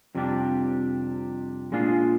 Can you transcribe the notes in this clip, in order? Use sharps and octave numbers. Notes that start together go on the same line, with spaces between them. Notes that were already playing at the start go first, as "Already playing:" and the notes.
F2 C3 G3 D4 G4
A#2 G#3 D4 F4 G#4